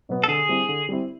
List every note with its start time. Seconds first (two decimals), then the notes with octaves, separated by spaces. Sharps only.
0.09 B2 F#3 B3
0.24 A4
0.28 D3 G#4
0.49 G3 C4 E4
0.69 D3
0.89 G3 C4 E4